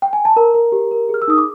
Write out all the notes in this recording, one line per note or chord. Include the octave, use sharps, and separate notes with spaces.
G5
G#5
A5
A#4 A#5
A#4
G4
A#4
G#4 F6
E6
D#4 D#6
D6